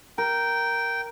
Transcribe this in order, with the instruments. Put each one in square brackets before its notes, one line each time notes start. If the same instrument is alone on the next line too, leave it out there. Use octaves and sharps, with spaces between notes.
[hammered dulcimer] A#4 [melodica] G5